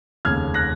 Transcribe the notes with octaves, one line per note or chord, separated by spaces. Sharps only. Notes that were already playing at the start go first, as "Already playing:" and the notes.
F1 D#2 C#3 F6 G#6
F#6 A#6